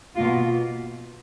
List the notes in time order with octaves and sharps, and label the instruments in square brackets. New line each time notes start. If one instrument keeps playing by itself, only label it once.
[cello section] B2 A#3 F4